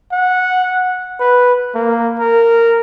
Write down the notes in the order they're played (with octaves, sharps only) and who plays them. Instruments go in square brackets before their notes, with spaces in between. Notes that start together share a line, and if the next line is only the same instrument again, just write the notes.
[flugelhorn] F#5
B4
A#3
A#4